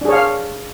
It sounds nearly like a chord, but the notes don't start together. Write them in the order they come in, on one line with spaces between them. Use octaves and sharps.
D4 G#4 C#5 F5